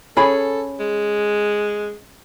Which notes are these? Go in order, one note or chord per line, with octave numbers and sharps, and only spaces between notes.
C#4 G#4 A4 B5
G#3